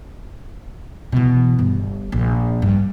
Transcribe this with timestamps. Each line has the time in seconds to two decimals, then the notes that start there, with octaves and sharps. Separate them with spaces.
1.12 B2 E3
1.59 G1
2.12 A#1
2.62 G2